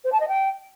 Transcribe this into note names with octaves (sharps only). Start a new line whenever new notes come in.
C5
A5
D#5
G5